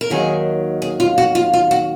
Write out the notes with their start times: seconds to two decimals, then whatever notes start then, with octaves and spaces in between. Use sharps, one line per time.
0.01 A#4
0.10 D#2 D#3 F#3 G#4
0.82 G#4
1.00 F4
1.18 F#4
1.35 F4
1.54 F4
1.71 F#4